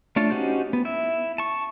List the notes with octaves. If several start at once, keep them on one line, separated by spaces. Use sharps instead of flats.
A3 D4 F4 C#5 A5
C#4 D#4 F#4 G4 C5
B3
E4 E5
A5 C#6